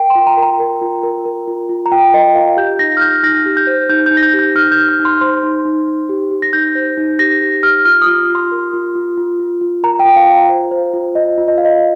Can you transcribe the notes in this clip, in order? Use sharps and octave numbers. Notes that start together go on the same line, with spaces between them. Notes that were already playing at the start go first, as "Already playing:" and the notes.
Already playing: A#4 G5
C6
F4
A#5
A#4
A#5
A#4
F4
A#4
A#4
F4
F4
A#5
F4 G5
A#4 D#5
F4 F5
G4 G6
D#4 A#6
F6
D#4 G6
D#4 A#6
G4
G6
C5
D#4 G6
D#4 G6
A#6
G6
G4
G6
D#4 F6
G6
D#4
F6
D#4
C6
C5 C6
D#4
D#4
D#4
G4
G4
A#6
D#4 G6
C5
D#4
G4 A#6
G4
G4 F6
F4 F6
D#6
F4
F4
C6
A#4
F4
F4
F4
F4
F4
A#4 A#5
G5
F4
F5
F4
C5
C5
F4
F4 D#5
F4
D#5
F4 F5
D#5